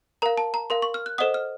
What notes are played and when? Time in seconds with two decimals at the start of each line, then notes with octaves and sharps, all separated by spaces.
0.22 A#4 F5 A#5
0.38 A5
0.54 A#5
0.70 A#4 F5 C6
0.82 C#6
0.94 F6
1.06 F#6
1.18 A4 C5 D#5 F#5 D#6
1.34 F6